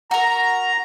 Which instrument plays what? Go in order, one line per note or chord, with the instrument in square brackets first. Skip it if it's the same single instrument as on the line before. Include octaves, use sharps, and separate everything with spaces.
[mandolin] F#4 A#4 [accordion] A#5